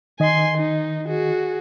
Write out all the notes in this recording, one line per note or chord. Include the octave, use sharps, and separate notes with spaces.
D#3 D#5 G#5 C6
D#4
F#4 G#4